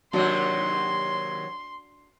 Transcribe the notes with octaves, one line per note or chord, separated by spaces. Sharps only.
D#2 C3 F#3 D4 F#4 C6